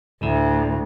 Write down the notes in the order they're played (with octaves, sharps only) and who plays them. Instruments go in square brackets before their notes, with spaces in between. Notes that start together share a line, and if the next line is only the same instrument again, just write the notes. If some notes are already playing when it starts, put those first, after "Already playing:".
[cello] D2 [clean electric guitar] A2